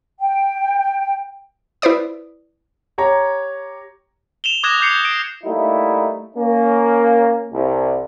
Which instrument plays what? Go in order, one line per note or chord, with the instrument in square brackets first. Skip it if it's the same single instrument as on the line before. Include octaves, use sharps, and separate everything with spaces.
[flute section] G5
[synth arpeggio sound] E4 B4 C5 D5 D#6
[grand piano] G4 C#5 A#5
[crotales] E7 F7 G7
D6 D#6 F#6 G#6 A#6 E7
D6 G6 C7 C#7
D7
[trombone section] G3 A3 A#3 D#4 E4
A#3 C#4
C2